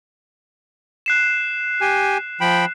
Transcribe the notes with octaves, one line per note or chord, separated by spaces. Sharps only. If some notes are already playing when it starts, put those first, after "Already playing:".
F#6 C7 E7
G4 G#5
F3 G5 B5